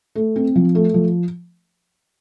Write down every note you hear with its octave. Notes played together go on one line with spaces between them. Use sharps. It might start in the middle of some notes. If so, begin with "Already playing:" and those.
A3
C4
F3
A3
F3